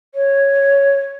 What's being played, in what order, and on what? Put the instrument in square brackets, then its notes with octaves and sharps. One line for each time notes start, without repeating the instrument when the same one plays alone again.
[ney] C#5